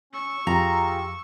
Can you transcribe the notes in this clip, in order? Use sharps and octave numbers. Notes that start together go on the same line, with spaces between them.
C#4 C#6 E6
F2 F4 G4 G#4 A#5